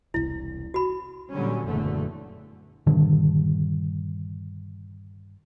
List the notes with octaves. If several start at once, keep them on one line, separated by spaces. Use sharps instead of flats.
E1 C2 E4
F#4 B5
A#2 D3 F#3 G3 C#4
F#1 E2 A#2 D3 A3
G2 A#2 D3 D#3